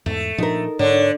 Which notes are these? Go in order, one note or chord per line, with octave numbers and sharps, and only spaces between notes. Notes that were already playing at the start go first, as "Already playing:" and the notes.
E2 G#2 A3
A#2 F3 D4 D#4 A#4
G#2 D3 C#5